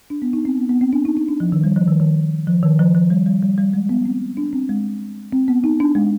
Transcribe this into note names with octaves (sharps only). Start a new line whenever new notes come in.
D4
B3
D#4
C4
B3
B3
C4
D4
D#4
D#4
D4
F3
D#3
G3
F3
D#3
D#3
F3
D#3
F3
F3
G3
G3
G3
G3
G#3
B3
C4
D4
C4
G#3
C4
B3
D#4
D4
G#3